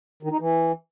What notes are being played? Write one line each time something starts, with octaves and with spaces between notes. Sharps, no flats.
D#3
D#4
E3